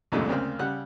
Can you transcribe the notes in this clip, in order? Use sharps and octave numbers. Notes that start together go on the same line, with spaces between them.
C2 F2 A#2 D3 G#3 A3
D2 C#3 A#3 C4 F5 F6
C#3 G3 F#5 F#6